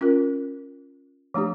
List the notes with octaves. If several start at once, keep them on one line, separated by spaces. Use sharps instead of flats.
C#4 F4 A#4
F3 A3 D4 G4